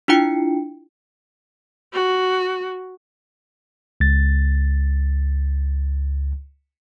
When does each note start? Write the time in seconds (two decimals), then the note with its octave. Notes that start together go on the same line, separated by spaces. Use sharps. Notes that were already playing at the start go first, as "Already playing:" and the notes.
0.08 D4 E4 F4 G5 C#7
1.93 F#4
4.00 C#2 A6